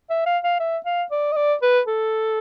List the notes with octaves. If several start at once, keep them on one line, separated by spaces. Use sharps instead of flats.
E5
F5
F5
E5
F5
D5
D#5
D5
B4
A4